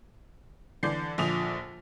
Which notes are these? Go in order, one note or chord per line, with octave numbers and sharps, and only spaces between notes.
D3 E3 D5 G6 C7
A#1 D3 F3 D#6 F7